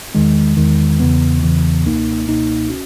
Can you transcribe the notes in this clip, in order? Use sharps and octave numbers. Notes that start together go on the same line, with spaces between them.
E2 D#3 G#3
E2 D#3 G#3
E2 C#3 E3 B3
E2 C#3 E3 B3
C#2 B2 A#3 D#4
C#2 B2 A#3 D#4
C#4 F#4